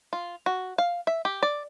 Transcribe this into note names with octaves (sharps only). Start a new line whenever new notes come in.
F4
F#4
F5
E5
G4
D5